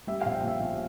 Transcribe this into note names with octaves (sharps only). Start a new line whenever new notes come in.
G3 E5
A#1 F5
G5
A#2 E5
A#1